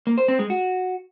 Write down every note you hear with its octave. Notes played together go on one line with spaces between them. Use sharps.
A#3
C5
C4
G#3
F#4